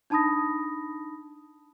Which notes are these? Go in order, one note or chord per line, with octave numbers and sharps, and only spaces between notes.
D4 D#4 A5 B5 D#6 A#6